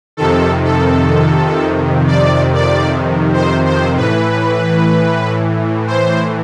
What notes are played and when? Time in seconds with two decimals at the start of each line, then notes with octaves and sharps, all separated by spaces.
0.17 F2 C3 D#3 A4
0.65 A4
2.07 D5
2.54 D5
3.33 C5
3.66 C5
3.97 A2 E3 B4
5.87 C5